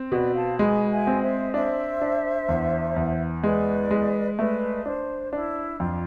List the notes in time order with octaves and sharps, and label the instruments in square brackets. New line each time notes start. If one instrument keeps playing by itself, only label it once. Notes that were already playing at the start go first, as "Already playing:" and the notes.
Already playing: [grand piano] C4
[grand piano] B2 [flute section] B4 D5
[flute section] F5 A5
[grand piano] G#3 [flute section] G#5 B5
[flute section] E5 G#5
[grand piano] C4
[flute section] C5 E5
[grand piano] D4 [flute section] C5 E5
[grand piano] D4
E2
E2
[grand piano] G#3 [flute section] B4 D5
[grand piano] G#3
[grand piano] A3 [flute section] B4 D5
[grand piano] D4 [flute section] C5
[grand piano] D4 [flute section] E4
[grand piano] F2 [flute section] F4